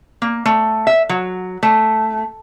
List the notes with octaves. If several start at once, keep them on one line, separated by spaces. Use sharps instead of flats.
A#3
A3
E5
F#3
A3